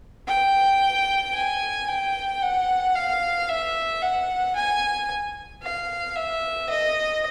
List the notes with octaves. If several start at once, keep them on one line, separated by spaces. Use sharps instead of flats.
G5
G#5
G5
F#5
F5
E5
F#5
G#5
F5
E5
D#5